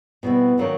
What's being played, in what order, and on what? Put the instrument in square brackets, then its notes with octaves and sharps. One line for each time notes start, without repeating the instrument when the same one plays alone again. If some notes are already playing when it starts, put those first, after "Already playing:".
[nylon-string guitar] B2 G3 C4 E4 [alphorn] B3
[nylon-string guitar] D#3 F#3 A#3 D4